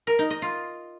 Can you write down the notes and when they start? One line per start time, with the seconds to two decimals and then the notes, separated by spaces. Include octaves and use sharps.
0.07 A#4
0.19 D#4
0.30 D#5
0.42 F4